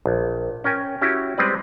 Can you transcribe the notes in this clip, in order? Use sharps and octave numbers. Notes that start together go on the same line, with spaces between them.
A#1
C#4 A#4 G5 G#5
C#4 E4 F#4 G4
G3 G#3 C4 B4 D5